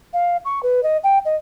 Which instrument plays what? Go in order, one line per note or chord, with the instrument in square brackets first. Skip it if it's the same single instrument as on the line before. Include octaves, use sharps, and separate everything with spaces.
[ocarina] F5
C#6
B4
D#5
G5
D#5